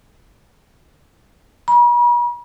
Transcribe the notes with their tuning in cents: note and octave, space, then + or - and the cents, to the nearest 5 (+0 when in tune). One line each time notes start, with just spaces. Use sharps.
B5 -45